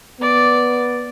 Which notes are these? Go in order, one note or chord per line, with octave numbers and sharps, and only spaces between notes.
B3 D5